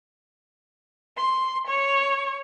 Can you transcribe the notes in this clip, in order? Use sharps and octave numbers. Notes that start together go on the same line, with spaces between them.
C6
C#5